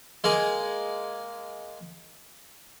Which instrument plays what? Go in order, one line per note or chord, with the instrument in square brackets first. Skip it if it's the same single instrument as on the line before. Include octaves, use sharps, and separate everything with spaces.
[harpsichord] G#3 A#3 G#4